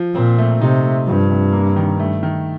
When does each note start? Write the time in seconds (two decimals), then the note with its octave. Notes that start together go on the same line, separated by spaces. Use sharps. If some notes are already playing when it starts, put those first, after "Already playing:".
Already playing: F3
0.15 A#2 C4
0.38 A3
0.60 C3 D#4
0.83 A3
1.07 G2 F3
1.30 C3
1.53 A#3
1.76 D#3
2.00 A3
2.23 D#3